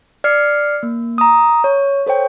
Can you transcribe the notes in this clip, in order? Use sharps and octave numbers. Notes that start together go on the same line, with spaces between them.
D5 F6 C7 C#7
A#3
A#5 D#6
C#5
A4 C5 C#5 G5